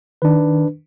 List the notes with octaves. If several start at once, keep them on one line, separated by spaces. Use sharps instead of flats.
D#3 D4 B4